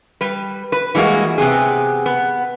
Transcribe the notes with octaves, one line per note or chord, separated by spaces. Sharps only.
G3 B4
B4
E3 G3 G#3 A#3 F#4
C3 B3 C4 G#4
B3